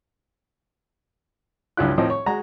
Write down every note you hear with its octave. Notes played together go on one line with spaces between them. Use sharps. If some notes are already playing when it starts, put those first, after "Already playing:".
C#2 G2 F#3 E4 F4 F#6
A2 D#3 F3 C4 D#4
C#5
G#3 F#4 A#5